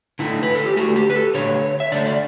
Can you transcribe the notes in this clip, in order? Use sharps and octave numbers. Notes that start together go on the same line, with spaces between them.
D3 A3 E4
B4
A4
G4
D3 A3 F#4
G4
B4
A4
D3 A3 C#5
E5
D3 A3 D5
D5